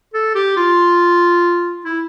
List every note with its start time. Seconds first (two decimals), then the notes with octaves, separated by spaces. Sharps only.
0.14 A4
0.35 G4
0.57 F4
1.85 E4